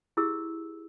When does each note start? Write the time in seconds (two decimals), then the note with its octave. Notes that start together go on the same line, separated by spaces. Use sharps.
0.17 E4 G4 G#4 E6